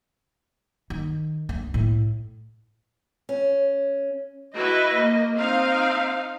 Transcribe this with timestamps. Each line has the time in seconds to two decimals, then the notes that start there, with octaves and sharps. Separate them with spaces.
0.90 D#3
1.49 D2
1.74 A2
3.29 C#4
4.55 E4 F#4 B4 D#5
4.94 A#3
5.38 C4 D#4 F5